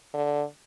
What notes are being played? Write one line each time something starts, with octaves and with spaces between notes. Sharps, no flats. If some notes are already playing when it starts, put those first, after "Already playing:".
D3